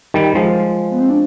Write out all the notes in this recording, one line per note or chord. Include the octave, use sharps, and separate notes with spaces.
D#3 G3
F3 G#3 F4
B3
C4
D4